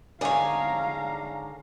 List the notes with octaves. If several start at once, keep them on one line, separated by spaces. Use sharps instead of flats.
G#2 D3 G#4 C#5 D5 F5 A#5